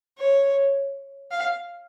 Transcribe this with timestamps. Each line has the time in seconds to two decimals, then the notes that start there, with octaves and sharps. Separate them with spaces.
0.18 C#5
1.31 F5